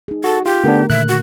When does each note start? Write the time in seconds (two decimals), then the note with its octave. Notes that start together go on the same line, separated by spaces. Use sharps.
0.08 D#4 G#4
0.24 F#4 A4
0.46 F4 G4
0.64 D3 A3 B3 D4 A#4
0.90 A#2 D3 D#3 E5 F#6
1.08 F#4